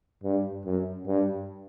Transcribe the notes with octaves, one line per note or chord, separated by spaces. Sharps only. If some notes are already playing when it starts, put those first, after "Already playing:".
G2
F#2
G2